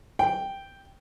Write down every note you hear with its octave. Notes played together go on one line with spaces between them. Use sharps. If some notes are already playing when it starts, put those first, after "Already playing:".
G5